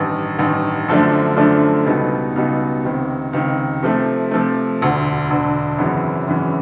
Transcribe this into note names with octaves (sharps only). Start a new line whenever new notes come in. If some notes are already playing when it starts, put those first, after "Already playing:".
Already playing: A1 G2 D#3
A1 G2 D#3
F#2 D3 F3 A3 D4
F#2 D3 F3 A3 D4
C#2 B2 G3 B3 D#4
C#2 B2 G3 B3 D#4
C#2 C3 D#3
C#2 C3 D#3
C3 F3 A3
C3 F3 A3
E1 D2 D3
E1 D2 D3
G#1 F#2 C#3 E3
G#1 F#2 C#3 E3